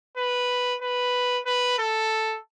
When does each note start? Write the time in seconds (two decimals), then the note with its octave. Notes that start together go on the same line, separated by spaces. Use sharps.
0.17 B4
0.82 B4
1.46 B4
1.79 A4